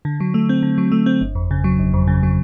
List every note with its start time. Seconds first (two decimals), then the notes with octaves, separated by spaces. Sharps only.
0.05 D3
0.20 F#3
0.34 A3
0.49 C4
0.63 D3
0.78 F#3
0.92 A3
1.06 C4
1.21 G1
1.35 F2
1.51 C#3
1.64 F#3
1.79 G1
1.94 F2
2.07 C#3
2.23 F#3